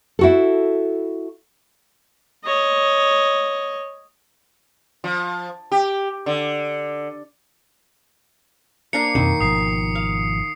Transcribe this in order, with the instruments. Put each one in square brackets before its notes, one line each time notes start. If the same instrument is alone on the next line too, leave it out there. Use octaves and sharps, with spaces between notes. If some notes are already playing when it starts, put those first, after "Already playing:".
[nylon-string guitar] E4 F#4 A4
[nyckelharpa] C#5 D#5
[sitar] F3
G4
D3
[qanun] A#3 D4 A#4 [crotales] C7 C#7
[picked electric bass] F2 B2 C4 [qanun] D#3
[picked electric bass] G#1 B2 F3 [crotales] D#6 C7
[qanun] F5